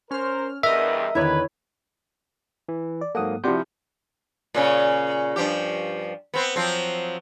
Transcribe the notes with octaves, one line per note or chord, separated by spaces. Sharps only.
C#4 A#4 C5 F6
E2 G2 A#4 D#5 E5
E2 D3 D#3 E4 B4 C#5
E3
D5
G#2 F#3 A#3 A4 F#5 D#6
C3 F3 E4 F#4 D5 G6
A#2 C#3 C#4
G2 F3 G4
B3 C4
F3 F#3 C4